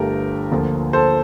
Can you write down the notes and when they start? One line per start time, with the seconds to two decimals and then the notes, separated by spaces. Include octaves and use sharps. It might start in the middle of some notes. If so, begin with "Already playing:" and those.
Already playing: G1 G2 D3 A3 G4 A#4
0.51 D2 D3 F3 A#3 F4
0.93 A4 C5